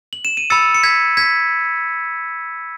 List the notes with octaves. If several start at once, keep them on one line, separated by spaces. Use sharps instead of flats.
F#7
E7
D#7
B5 E6 A6 C#7
C#7
G#6 B6
G#6 B6